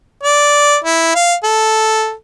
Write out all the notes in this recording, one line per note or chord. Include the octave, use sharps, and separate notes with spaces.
D5
E4
F5
A4